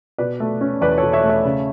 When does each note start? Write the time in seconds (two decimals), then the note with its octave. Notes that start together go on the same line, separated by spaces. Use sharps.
0.18 B2 B4 D5
0.40 A3
0.61 C#4
0.81 E2 B4 D5
0.98 A4 C#5
1.03 B2
1.13 C#5 E5
1.23 A3
1.29 C#5 E5
1.44 C#3